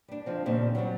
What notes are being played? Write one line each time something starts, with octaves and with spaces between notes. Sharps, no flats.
G3 D4
F2 F3 C4
D#2 A#2 C#3 C4
F#3 G3 D4 F#4